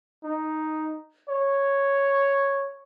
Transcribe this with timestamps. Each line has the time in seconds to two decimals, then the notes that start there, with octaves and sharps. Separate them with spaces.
0.24 D#4
1.29 C#5